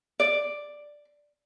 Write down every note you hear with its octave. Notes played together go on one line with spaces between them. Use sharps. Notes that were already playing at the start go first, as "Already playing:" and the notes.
D5